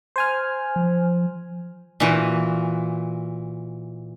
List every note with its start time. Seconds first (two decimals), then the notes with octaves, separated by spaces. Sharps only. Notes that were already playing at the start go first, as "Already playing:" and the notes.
0.16 C5 G#5 F6
0.76 F3
2.00 A#2 E3 F#4